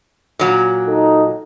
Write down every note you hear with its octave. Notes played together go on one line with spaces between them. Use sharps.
A#2 F#3
D#4 A4